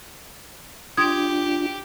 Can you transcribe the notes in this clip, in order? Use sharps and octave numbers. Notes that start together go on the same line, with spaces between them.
D4 F4 G4 C6 D#6 G#6